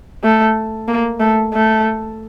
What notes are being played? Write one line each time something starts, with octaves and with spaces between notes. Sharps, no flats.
A3
A#3
A3
A3